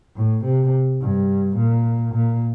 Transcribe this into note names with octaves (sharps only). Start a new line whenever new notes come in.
A2
C3
G2
A#2
A#2